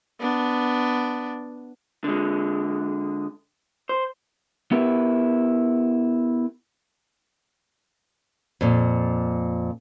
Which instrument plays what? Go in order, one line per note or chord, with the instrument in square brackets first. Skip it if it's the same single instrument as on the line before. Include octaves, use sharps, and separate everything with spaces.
[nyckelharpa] B3 D4
[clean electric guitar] D3 G#3
C5
B3 E4 G4 A#4 B4
[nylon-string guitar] F2 A#2